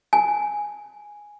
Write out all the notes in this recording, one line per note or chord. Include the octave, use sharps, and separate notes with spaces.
G#5